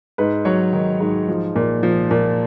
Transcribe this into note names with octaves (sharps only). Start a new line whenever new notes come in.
G#2 B4
F#3 C#5
D#3
G#2
F3
A#2
F3
A#2